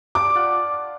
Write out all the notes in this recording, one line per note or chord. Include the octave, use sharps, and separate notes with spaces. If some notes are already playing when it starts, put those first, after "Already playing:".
D4 G4 D6
F4 F#5